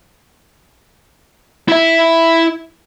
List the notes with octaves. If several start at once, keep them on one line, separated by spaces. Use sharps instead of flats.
E4 E5